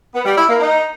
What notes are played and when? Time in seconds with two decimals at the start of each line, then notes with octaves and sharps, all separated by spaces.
0.14 B3
0.25 G3
0.36 E4
0.48 A#3
0.59 D#4